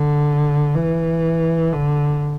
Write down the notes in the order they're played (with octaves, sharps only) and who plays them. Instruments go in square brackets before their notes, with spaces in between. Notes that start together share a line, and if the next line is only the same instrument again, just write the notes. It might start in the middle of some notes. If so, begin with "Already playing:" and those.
Already playing: [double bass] D3
E3
D3